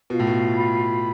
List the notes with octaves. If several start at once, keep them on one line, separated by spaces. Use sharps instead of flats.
B2 F4
A2
B2
B5